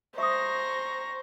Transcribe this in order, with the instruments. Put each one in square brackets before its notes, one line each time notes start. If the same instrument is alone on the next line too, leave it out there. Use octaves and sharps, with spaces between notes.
[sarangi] C5 [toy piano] E5 D#6 [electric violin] A#5 A#6 [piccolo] C#6